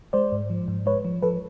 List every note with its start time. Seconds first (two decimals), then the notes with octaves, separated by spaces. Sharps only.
0.13 G#3 C5 D5
0.32 G#2
0.50 F3
0.68 G#2
0.86 G#3 B4 C#5
1.05 F3
1.23 F3 A4 B4